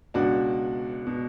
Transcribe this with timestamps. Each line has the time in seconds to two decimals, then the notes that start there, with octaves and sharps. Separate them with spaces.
0.14 C#2 B2 D4 F#4
1.07 B2